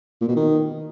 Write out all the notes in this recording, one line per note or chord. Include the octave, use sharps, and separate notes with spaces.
A#2
B2
D#3